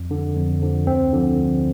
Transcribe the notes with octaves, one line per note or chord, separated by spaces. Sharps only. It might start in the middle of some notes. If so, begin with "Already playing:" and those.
Already playing: F2
D3 F3
F2
D3 F3
D2 C4
D3 F3
D2